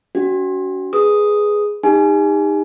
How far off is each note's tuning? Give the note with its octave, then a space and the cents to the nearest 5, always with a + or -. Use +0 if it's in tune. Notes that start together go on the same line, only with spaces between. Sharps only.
C#4 +40 F#4 +20
G#4 +0 B4 +0 D#6 +0
D#4 +0 G4 +40 G#5 +25